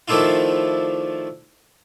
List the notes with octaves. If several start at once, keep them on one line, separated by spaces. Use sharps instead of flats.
D#3 F3 A3 D4 E4 F4